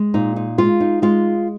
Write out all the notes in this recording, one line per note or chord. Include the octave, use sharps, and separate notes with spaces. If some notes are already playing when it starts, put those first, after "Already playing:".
Already playing: G#3
A#2 D#4
D#4
G#3 F4
D#4
G#3 F4